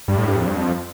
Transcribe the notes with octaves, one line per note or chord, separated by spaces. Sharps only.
G2
A2
G2
F2
G2
F2